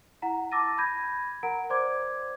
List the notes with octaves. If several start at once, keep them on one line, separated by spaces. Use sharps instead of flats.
E4 F#5 A#5
A5 D6 E6 A6 A#6 D#7
B5 G6 G#6 A#6 D#7
A#4 F#5 A#5 D7
C5 D5 C6 D6 G#6